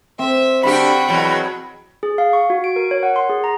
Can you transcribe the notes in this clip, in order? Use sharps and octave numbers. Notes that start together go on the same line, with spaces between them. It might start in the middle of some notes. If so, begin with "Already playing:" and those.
C4 E5
G2 D3 F#4 G4 G5 B5
E2 B2 F#3
G#4
F5
C#6
F#4
D7
A#4
C#5
F#5
C6
G#4
A#5